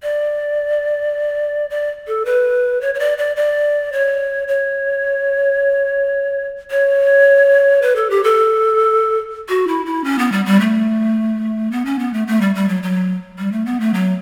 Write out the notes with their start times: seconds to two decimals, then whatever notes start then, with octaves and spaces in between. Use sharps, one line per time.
0.03 D5
1.70 D5
2.07 A4
2.25 B4
2.81 C#5
2.95 C#5
2.99 D5
3.18 D5
3.36 D5
3.93 C#5
4.48 C#5
6.71 C#5
7.82 B4
7.96 A4
8.10 G4
8.24 A4
9.49 F#4
9.67 E4
9.86 E4
10.04 C#4
10.19 B3
10.32 G3
10.46 G3
10.60 A3
11.71 B3
11.85 C#4
11.99 B3
12.13 A3
12.27 A3
12.41 G3
12.55 G3
12.69 F#3
12.83 F#3
13.39 G3
13.52 A3
13.66 B3
13.80 A3
13.94 F#3